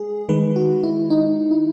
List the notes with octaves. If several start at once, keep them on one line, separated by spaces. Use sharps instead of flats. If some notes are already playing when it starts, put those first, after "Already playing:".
Already playing: G#3 G#4
D#3 G#3 B4
F#4
E4
D#4
E4